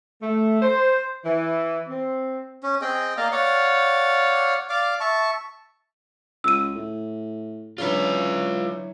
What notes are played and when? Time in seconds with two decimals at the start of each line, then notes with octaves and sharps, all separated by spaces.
0.22 A3
0.62 C5
1.25 E3
1.88 C4
2.63 C#4
2.81 C4 G#4 D#5 G5
3.17 A#3 D5 D#5 F5
3.32 C#5 D5 F5 F#5
4.69 D5 F5 D6
5.00 E5 A5 C#6
6.44 C#2 E6 D#7
6.75 A2
7.78 C#3 E3 F#3 D4 F4 B4